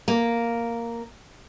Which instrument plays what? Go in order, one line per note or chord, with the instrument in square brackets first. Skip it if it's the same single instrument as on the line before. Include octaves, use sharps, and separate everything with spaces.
[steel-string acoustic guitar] A#3